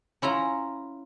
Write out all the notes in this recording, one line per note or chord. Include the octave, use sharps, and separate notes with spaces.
C#4 E4 F4 A#5